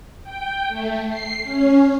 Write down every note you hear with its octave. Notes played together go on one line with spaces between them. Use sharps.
G5
A3
C7
C#4